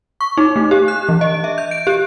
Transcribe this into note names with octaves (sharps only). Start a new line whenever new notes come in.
C#6
D#4
A3
G4
F#6
E3
D#5
E5
G6
D7
G4